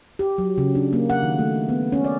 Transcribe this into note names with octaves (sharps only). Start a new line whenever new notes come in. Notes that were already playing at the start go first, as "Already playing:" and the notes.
G4
F#3
C#3
D4
A#3
F#5
D#3
A3
B3
C#4
D5